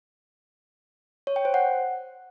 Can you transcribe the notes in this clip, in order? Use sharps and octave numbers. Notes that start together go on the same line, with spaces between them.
C#5
G5
C5
F#5